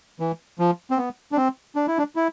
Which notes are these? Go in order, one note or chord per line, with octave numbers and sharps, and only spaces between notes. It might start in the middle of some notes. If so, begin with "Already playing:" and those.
E3
F3
C4
B3
D4
C4
D4
E4
D4
E4